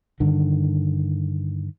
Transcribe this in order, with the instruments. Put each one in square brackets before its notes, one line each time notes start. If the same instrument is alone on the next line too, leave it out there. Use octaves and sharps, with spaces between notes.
[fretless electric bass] G2 D3 D#3